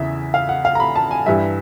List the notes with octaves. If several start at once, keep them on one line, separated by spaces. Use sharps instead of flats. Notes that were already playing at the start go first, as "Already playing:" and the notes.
Already playing: E2 C#3 E3 E5
F5
F#5
F5
A#5
B5
A5
G#5
G2 E3 G3 E5